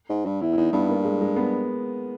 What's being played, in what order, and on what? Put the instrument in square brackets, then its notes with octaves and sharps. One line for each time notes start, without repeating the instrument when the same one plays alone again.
[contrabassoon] G#2
G2
[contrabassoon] E2 [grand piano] E4
[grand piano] E4
[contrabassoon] E2 [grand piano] D#4
[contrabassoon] G2 [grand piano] B3
[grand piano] A#3
G#3
G#3
B3